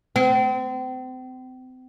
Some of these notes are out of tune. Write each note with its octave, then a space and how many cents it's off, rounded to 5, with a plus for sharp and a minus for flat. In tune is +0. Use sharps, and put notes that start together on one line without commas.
C4 -35